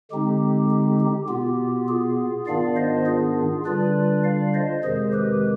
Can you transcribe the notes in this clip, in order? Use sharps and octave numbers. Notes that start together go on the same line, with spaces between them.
D3 G#3 C4 D#4 G4
G4
G4
B2 B3 F4 G4
F4 G#4
G#2 D#3 B3 D4 F4 D5 F5
C5 D#5
F4 G#4
D3 G3 D4 F4 B4 D5
D5 F5
C5 D#5
F2 C3 D#3 G#3 G#4 C5
G4 B4